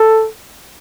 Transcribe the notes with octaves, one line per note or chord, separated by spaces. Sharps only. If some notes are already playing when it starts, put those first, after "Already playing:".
Already playing: A4